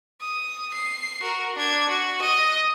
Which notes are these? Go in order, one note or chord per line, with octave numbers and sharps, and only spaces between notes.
D#6
C7
F#4 A#4
D4 G#6
F#4
D#5